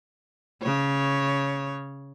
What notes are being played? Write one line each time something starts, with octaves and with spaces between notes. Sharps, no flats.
C#3 C#5